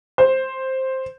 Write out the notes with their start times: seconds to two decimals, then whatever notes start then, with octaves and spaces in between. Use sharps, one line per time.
0.18 C5